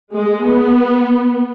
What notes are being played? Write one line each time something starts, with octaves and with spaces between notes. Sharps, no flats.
G#3
B3